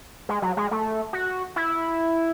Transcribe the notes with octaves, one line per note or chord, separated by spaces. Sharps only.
G#3
F#3
G#3
A3
F#4
E4